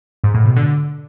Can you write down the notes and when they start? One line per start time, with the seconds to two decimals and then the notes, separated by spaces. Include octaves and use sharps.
0.24 G#2
0.34 A2
0.45 B2
0.56 D3